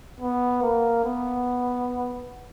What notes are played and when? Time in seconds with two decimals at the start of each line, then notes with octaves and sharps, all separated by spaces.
0.20 B3
0.62 A#3
1.05 B3